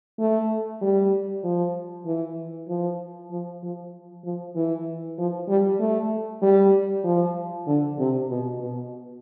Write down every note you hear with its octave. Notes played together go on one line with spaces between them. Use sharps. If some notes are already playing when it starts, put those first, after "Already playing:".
A3
G3
F3
E3
F3
F3
F3
F3
E3
F3
G3
A3
G3
F3
D3
C3
B2
B2